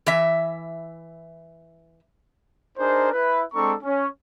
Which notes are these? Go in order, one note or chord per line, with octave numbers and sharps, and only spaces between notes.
E3 E5
D4 D#4 G#4 A#4 C5
E4 B4
G#3 C4 D4 A4 A#5 C#6
C#4